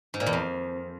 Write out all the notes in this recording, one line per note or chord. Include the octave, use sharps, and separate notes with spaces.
G#2
A#2
E2
F2